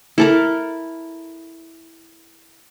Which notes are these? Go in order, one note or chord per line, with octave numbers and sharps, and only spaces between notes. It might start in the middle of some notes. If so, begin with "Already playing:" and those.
E4 A4 A#4